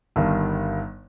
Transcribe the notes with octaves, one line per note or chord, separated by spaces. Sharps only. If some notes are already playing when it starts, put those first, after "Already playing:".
G1 G2 D#3